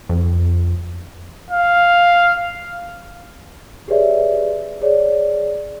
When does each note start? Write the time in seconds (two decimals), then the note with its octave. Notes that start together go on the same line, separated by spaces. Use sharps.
0.09 F2
1.51 F5
3.88 G4 G#4 B4 C#5 D5 E5
4.81 G#4 C#5 D5